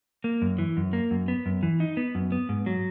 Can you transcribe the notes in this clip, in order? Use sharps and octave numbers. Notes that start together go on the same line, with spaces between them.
A#3
F#2
E3
F#2
A#3
F#2
B3
F#2
E3
D#4
B3
F#2
B3
G#2
F#3